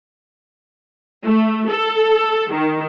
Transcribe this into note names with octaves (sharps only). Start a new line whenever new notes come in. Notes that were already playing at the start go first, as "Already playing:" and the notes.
A3
A4
D#3